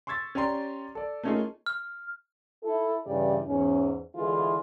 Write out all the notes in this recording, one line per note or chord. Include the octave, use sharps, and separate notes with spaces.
C6 C#6 E6 G#6 A6 B6
C#4 G4 D5 A#5 C6
A4 D5
A3 A#3 C#4 D#4 F4 G#4
F6
E4 A4
G2 C#3 E3 G4 D5
E2 G#2 C#4
D3 E3 G#3 E4 F4 G#4